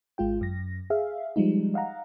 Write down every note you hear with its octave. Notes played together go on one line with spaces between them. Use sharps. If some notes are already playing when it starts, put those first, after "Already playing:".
G#1 G#3 F4 G5
F#2 A#6
G#4 E5 F5
F3 G3 G#3 D#4
D#5 F5 F#5 A#5